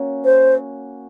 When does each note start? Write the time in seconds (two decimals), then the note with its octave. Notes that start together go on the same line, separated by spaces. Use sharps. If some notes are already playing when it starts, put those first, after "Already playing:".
Already playing: A#3 C#4 F#4
0.25 C5